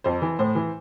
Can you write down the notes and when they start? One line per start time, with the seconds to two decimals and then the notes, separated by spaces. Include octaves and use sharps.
0.04 F2 C5
0.22 E3
0.39 A2 C5
0.55 E3